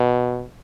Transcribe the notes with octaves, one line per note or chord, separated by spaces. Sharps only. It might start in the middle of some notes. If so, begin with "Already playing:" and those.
Already playing: B2